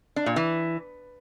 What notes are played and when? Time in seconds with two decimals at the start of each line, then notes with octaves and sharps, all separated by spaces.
0.16 D4
0.26 A#2
0.36 E3